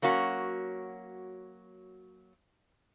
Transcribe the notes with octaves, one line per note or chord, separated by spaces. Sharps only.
F#3 A#3 C#4 F#4